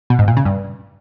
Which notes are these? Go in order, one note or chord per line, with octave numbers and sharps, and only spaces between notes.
B2
G#2
A#2
C#3
G2